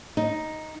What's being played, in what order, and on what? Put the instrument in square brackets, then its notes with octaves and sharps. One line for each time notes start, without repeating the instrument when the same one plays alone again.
[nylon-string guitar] D#4